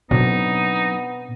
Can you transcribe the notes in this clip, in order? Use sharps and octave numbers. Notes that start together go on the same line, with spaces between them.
B2 F#3 B3 C4 D4 D#4